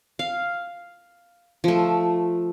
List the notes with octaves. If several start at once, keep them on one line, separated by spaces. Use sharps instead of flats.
F5
F3 A3